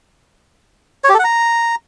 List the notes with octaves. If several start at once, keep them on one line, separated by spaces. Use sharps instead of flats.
C#5
G4
A4
F#5
A#5